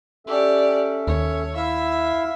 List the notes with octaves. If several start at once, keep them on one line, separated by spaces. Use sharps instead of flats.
C#4 G4 A4 D5 E5
D#2 C#5
E4 E5 F5